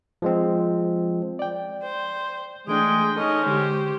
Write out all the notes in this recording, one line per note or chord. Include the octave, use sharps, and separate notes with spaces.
F3 G#3 C4
D5 G5
C5
E3 G#3 A3 D4 G#4 G5
C#4 D#4 A4 D#5
D3 G#3 G4 C5